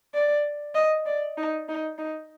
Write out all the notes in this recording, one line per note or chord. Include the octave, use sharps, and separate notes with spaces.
D5
D#5
D5
D#4
D#4
D#4